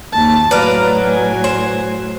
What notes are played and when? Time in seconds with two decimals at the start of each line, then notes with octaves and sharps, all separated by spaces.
0.13 D#2 A5
0.51 A2 F#3 B4 D5 F5 A#5
1.06 G#5
1.44 C5